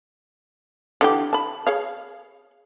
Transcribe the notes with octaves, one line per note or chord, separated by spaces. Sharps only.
D3 E3 G4
A5 B5
G#4 C#5 F5